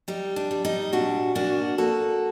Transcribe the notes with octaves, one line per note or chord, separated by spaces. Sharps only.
G3 D#4
D4
G3
D#4
A#2 D4 F#4
A#3 D4 F#4
A#3 F#4 A4